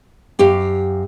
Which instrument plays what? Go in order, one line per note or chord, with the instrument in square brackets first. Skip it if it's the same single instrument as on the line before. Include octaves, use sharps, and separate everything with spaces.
[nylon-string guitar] F#2 G4 F5